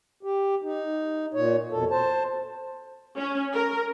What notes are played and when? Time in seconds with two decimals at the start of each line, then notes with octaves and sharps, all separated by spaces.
0.23 G4
0.63 D#4
1.34 A#2 C#5
1.71 F2 B2 A4
1.91 C5 A5
3.18 C#4
3.54 A#4